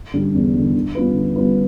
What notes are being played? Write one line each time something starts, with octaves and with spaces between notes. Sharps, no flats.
D3 G3
E2
D3 G3
D3
G3 B3 F4 B4
D3
G3 B3 F4 B4